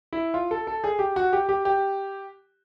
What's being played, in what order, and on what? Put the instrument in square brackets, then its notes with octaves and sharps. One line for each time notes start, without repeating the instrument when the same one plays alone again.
[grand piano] E4
F4
A4
A4
G#4
G4
F#4
G4
G4
G4